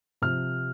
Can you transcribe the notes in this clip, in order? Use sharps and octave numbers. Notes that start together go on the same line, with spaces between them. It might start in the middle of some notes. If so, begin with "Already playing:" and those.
C3 F3 F6